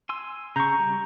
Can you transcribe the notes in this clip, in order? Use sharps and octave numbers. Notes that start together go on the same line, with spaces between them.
G#5 C6 E6
C#3 A#5 C#6 G6
G3